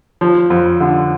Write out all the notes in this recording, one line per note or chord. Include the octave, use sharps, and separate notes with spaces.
F3
F2
D3